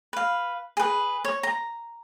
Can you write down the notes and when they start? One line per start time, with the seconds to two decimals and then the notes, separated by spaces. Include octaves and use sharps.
0.13 B4 F5
0.77 G#4 B4
1.25 C#5
1.43 A#5